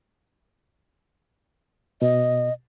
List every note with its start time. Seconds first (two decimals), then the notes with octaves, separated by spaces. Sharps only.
2.02 B2 D#5